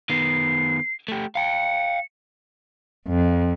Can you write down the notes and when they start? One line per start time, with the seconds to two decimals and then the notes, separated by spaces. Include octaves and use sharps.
0.10 D#3 B3 C7
1.08 A3 G4
1.35 F5 G5 C#7
3.07 F2